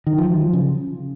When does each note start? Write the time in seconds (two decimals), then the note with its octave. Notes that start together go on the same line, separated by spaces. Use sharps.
0.07 D#3
0.18 F3
0.30 F#3
0.42 F3
0.53 C#3